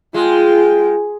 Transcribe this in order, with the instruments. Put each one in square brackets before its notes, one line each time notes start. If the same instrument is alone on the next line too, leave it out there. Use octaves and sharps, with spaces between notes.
[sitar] G#3 [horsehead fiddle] F4 G5